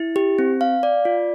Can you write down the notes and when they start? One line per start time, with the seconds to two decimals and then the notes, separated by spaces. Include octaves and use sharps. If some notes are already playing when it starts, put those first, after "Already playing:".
Already playing: E4
0.16 G4
0.39 C4
0.61 F5
0.83 D5
1.05 F4